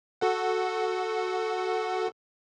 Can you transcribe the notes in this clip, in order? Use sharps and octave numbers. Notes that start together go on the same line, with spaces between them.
F#4 A4 F#5